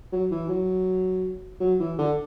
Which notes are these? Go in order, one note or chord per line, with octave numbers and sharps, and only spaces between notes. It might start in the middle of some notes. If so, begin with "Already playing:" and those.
F#3
E3
F#3
F#3
E3
D3